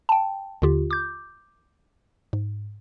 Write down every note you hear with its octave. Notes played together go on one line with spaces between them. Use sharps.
G5 A5
D#2 D3 F4 G4
D6 G6
G#2